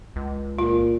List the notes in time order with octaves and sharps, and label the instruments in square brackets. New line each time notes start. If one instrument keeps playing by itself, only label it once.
[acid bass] C#2
[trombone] A#2 [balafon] F4